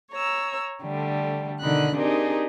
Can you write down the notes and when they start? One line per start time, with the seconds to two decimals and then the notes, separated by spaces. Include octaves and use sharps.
0.12 C#5 A#5 E6
0.82 D3 G3 A3
1.60 B2 D3 D#3 D#4 B5 F#6
1.96 C4 D4 D#4 G4 G#4 A#4